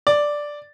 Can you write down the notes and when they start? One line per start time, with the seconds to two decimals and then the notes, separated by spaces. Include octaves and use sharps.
0.07 D5